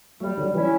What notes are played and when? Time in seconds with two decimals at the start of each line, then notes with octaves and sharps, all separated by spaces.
0.20 F#3 G3 A3
0.37 D3 F#3
0.54 E3 G3 C#4 E4